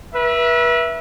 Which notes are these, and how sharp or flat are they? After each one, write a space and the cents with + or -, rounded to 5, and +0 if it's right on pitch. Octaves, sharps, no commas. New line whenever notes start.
B4 -35 E5 +0